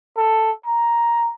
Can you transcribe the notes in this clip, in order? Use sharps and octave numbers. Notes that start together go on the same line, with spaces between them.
A4
A#5